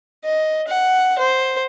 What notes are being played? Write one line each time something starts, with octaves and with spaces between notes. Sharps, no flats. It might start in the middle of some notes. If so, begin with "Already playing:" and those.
D#5
F#5
C5